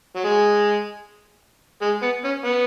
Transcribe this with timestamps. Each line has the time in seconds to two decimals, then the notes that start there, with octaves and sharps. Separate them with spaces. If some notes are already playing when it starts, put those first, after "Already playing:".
0.16 F#3
0.24 G#3
1.82 G#3
2.02 B3
2.24 C#4
2.45 B3